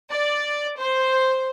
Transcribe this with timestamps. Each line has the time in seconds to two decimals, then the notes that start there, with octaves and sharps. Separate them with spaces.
0.12 D5
0.80 C5